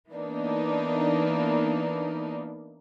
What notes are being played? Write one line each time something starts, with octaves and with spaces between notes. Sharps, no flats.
E3 A#3 B3 D4 D#4